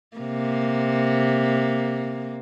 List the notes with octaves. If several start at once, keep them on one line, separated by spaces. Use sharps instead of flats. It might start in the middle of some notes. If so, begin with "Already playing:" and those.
C3 A#3